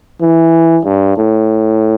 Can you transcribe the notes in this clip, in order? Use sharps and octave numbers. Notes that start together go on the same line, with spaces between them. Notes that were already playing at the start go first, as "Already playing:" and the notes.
E3
G2
A2